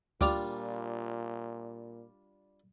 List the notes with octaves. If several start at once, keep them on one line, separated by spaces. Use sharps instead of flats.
D2 A#2 G3 D4 F4 G5 D6 F7